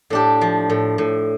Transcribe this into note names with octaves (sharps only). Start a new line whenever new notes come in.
A2 D4 G4
F3
A2
A2